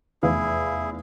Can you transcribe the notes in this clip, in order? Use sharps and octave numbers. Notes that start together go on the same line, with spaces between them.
F1 E2 E4 G#4 F5